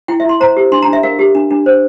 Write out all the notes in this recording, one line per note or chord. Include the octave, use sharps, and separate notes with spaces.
E4 G5
E5
E4 C6
C5 A#5
G4
D4 C6
A#5
D4
E5
A#4 F5
G4
D4
D4
C5